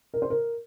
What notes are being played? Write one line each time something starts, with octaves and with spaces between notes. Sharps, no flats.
A#4
C5
A#4